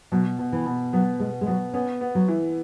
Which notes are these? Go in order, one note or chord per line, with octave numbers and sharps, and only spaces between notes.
B2 F#3
B2
E3
B2
F#3 B3
B2 G#3
G#3
F#3 B3
B3 C#4
B3
F#3
E3